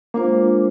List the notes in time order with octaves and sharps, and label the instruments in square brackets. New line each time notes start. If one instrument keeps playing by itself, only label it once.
[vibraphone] G#3 D4 F4 C5 [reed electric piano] A#3